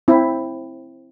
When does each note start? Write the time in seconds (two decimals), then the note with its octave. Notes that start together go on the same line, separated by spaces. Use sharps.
0.08 C4 E4